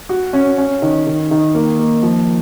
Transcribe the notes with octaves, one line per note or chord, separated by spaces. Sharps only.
F#4
C#4
C#4
D#3
D#3
D#3
A#3
A#3
F3